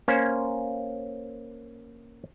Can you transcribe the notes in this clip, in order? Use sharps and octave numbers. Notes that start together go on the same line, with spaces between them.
A#3 C#4 C5